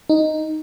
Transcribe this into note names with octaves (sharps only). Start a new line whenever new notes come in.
D#4